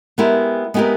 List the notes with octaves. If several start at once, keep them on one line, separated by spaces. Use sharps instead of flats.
G#3 B3 E4 G4 A#4
G#3 B3 E4 G4 A#4